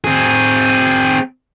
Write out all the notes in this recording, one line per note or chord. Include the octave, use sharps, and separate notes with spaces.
C4 G#4